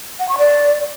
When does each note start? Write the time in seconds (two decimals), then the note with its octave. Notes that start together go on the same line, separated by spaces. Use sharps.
0.19 F#5
0.29 C#6
0.38 D5